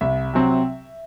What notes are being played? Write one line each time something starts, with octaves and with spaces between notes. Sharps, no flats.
C2 E5
C3 F#3 C4